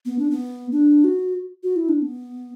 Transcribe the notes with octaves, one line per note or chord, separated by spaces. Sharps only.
B3
D4
B3
D4
F#4
F#4
E4
D4
B3